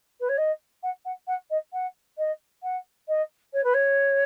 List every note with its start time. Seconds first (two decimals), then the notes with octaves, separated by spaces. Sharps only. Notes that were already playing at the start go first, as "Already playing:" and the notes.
0.20 B4
0.28 C#5
0.37 D#5
0.83 F#5
1.05 F#5
1.27 F#5
1.50 D#5
1.73 F#5
2.17 D#5
2.63 F#5
3.08 D#5
3.53 C#5
3.63 B4
3.74 C#5